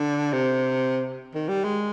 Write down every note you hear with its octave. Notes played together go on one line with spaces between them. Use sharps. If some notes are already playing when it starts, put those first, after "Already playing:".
Already playing: D3
C3
D#3
G3
G#3